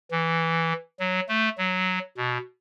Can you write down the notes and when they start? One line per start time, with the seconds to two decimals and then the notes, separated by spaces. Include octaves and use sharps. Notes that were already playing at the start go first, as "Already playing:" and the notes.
0.11 E3
1.00 F#3
1.29 A3
1.58 F#3
2.17 B2